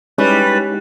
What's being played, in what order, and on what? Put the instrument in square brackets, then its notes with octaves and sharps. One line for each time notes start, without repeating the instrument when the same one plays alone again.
[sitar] G3 [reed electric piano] G#3 D#4 E4 [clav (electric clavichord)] C#4 [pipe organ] B4